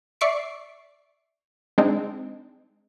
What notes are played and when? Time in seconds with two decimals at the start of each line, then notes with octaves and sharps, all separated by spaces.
0.21 D5 E5 C#6 D6 C7 D7
1.78 G#3 C4 D4 D#4